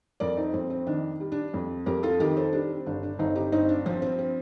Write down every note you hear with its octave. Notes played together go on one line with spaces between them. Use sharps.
F2 A#4 D5
C4 D#4
F2 C4
C4
D#3 D4
G3
D4
F2
F2 G4 A#4
F4 A4
D#3 G4 A#4
A4 C5
G3 D4
C4
G1 D4
D4
G1 C4 D#4
D#4 G4
G2 C4 D#4
D4
F3 C4
C4
C4